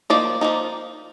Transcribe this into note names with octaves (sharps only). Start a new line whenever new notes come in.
F3 A#3 D#4 D5
F3 A#3 D#4